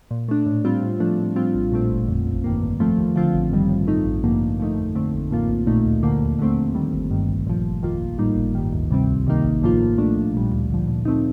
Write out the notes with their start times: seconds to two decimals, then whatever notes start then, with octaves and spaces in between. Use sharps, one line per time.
0.11 A#2
0.29 A3 D4
0.46 A2
0.65 G3 C4 F4
0.82 A2
1.00 F3 A3 D4
1.18 A2
1.36 G3 C4 F4
1.54 A#1
1.72 A#2 A3 C4
1.90 G1
2.08 F2 D3
2.26 A1
2.44 G2 D#3 A#3
2.62 G2
2.80 F3 A3 C4 F4
2.98 D#2
3.16 D3 F3 C4 F4
3.34 A1
3.51 G2 D#3 G3
3.69 A2
3.88 A3 D#4
4.05 A1
4.24 G2 D3 F3 A#3
4.41 G2
4.60 F3 A3 D#4
4.77 F2
4.95 D3 A3 C4
5.13 A1
5.31 A2 F3 A#3 F4
5.49 A#1
5.67 A#2 A3 D#4
5.85 D2
6.03 D3 F3 A#3
6.21 D#2
6.39 D3 A3 C4
6.57 D#2
6.75 D#3 G3
6.93 G1
7.11 G2 D#3
7.29 A#1
7.47 A#2 F3
7.65 G1
7.83 F2 D#3 A#3 F4
8.01 A#1
8.18 A2 G3 A#3 D#4
8.36 G1
8.55 G2 D#3
8.72 D2
8.91 C3 G3 C4
9.08 C2
9.27 C3 D#3 A#3 D#4
9.44 A1
9.62 A2 F3 A#3 F4
9.80 A2
9.98 A3 D4
10.16 A#1
10.34 A#2 G3
10.52 D2
10.70 D3 F3
10.88 A#2
11.05 F3 A3 C4 D#4